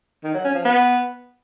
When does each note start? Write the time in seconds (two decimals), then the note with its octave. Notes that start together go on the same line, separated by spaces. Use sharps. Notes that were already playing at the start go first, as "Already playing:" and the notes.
0.24 D#3
0.34 F#3
0.44 C#4
0.55 F3
0.65 B3